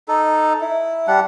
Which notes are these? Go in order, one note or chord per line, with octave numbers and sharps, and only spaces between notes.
D#4 A4
E4
G3 D4 F#5